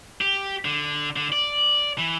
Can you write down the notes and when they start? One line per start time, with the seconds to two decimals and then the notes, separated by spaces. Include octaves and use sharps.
0.21 G4
0.65 D3
1.16 D3
1.32 D5
1.98 E3